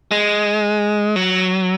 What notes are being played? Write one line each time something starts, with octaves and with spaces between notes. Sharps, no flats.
G#3
F#3